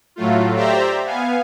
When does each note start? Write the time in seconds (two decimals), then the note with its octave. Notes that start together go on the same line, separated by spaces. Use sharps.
0.16 A2 F#3 A3 F4
0.55 G4 C5 D5 E5 A#5
1.05 B3 F5 G#5